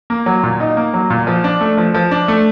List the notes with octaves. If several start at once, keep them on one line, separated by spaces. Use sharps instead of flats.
A#3
F#3
A#2
D#4
A#3
F#3
A#2
F3
D4
A3
F3
F3
D4
A3